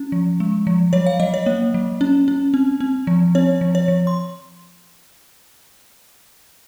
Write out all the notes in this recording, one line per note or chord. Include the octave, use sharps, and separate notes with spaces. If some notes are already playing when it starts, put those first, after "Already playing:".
Already playing: C#4
F3
G#3
F3
F#3 C#5
F5
F#3 D#5
C#5
A#3
F#3
C#4
C#4
C4
C4
F3
C4 C#5
F3
C#5
F3
C6